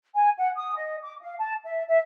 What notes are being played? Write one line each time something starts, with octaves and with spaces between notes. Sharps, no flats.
G#5
F#5
D#6
D#5
D6
F5
A5
E5
E5